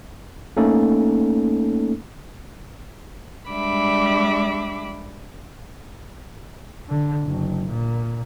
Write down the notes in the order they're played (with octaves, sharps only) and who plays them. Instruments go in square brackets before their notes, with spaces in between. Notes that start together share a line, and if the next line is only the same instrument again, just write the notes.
[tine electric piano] A3 A#3 C#4 D#4 A4
[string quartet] G3 G#3 D4 E5 B5 D6
[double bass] D3
F#1
A#2